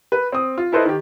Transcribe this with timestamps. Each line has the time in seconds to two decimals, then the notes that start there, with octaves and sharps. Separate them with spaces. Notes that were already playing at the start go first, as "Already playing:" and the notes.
0.12 B4
0.32 C4 D#6
0.58 F4
0.72 E4 A4 B4 C5 D#5
0.85 D#3 G4